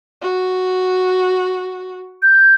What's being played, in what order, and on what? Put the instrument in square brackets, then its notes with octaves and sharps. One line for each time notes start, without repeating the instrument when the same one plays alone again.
[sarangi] F#4
[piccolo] G6